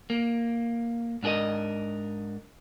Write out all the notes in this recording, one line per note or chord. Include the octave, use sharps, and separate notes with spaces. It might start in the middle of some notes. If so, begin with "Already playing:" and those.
A#3
G#2 D4 G#4 A#4 D#5